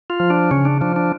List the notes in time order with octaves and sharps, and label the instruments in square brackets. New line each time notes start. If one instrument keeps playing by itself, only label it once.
[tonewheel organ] F4
F3
D4
C#3 C#4
D4
F3 D4
D4